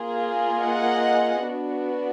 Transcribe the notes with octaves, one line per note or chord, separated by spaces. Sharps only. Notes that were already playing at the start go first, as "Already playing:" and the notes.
Already playing: A#3 F4 G#4
D#5 F#5
B3 D4 F#4